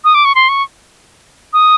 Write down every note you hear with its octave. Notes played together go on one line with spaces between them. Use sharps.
D#6
D6
C#6
C6
C#6
D#6